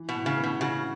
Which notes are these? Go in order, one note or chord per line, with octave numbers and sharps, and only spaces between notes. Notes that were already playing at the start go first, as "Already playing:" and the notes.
Already playing: E3
B2
A2
C#3
B3
B2
C#3 F#4